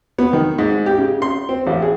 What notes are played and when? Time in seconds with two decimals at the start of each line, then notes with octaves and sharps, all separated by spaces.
0.18 B3
0.33 D#3
0.58 G#2
0.86 G4
0.98 C#3
1.22 C6
1.49 C4
1.67 A1
1.82 G#4